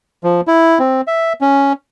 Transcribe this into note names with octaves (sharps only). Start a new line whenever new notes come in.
F3
E4
C4
E5
C#4